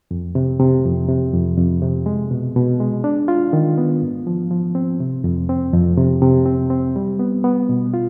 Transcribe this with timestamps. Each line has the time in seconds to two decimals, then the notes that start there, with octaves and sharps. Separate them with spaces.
0.11 F2
0.35 C3
0.60 C3
0.85 F2
1.08 C3
1.34 F2
1.57 F2
1.82 C3
2.06 G#3
2.31 B2
2.56 B2
2.80 G#3
3.04 D4
3.28 F4
3.53 D#3
3.78 B3
4.02 G#2
4.27 F3
4.51 F3
4.75 C4
5.00 C3
5.24 F2
5.49 C4
5.73 F2
5.98 C3
6.22 C3
6.46 C4
6.70 C4
6.96 G3
7.19 B3
7.44 B3
7.69 B2
7.94 F4